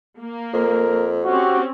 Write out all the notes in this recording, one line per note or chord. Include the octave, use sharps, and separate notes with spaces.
A#3
F2 A#4
C4 C#4 F#4 G4